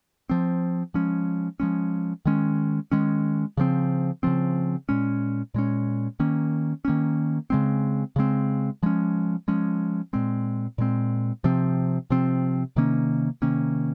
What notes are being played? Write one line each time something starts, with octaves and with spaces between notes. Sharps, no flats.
F3 C4
F3 G#3 C#4
F3 G#3 C#4
D#3 G#3 C#4
D#3 G#3 C#4
C#3 F3 C4
C#3 F3 C4
A#2 G#3 C#4
A#2 G#3 C#4
D#3 A#3 C#4
D#3 A#3 C#4
C#3 G#3 C4
C#3 G#3 C4
F3 G#3 C#4
F3 G#3 C#4
A#2 G#3 C4
A#2 G#3 C4
C3 F3 C4
C3 F3 C4
C3 D#3 A#3 C#4
C3 D#3 A#3 C#4